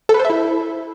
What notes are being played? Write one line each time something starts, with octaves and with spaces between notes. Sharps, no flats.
A4
B4
C5
E5
E4